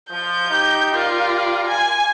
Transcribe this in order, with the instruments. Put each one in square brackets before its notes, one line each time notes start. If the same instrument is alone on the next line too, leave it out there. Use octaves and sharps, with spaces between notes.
[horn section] F3 [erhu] G6
[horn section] D#4 G4
[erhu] F4 [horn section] G4 A#4 D5
[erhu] G#5